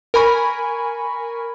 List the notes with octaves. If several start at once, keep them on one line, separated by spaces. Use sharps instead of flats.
A#4 G#5 B5 C#6